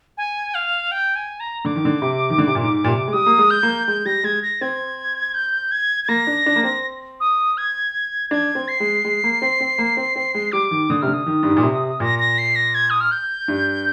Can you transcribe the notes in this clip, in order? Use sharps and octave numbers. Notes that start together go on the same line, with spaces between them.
G#5
F5
G5
G#5
A#5
D3 D6
D#3
D3
C3
D#3
D3
C3
A#2
G#2
A#2
C3
G#3
G3 D#6
A#3
G#3
G6
A#3
G#3 G6
G3 A#6
G#3 G#6
A#6
C4 G#6
G6
G#6
G#6
A#3 A#6
D4
D4
A#3
C4
D#6
G#6
D4 G#6
C4
C7
G#3
G#3
A#3
C4
C4
A#3
C4
C4
G#3
G3 D6
D#3
D3 D#6
C3 F6
D3
D#6
D#3
G2
G#2
A#2
C3
A#2 A#6
A#6
C7
A#6
G#6
D#6
F6
G6
G2